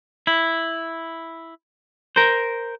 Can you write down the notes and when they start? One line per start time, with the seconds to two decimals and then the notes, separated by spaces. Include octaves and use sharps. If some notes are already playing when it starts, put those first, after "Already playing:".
0.27 E4
2.16 A#4 C5